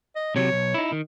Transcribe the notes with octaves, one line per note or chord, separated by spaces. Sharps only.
D#5
C3 F#3 C#5
B1
D#4 E4
D#3